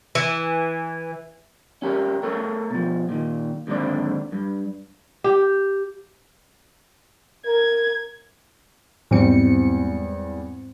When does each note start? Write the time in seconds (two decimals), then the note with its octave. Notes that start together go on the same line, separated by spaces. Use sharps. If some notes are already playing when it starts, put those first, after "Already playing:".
0.15 E3
1.82 C#4 G4 A#4
2.23 A3 A4 A#4 C#5
2.70 B2 F3
3.09 A#2 D#3
3.67 D#2 G#2 D3 C4 D5
4.32 G2
5.24 G4
7.46 A#4 G#6
9.11 E2 G#2 E3 G3 C4 C#7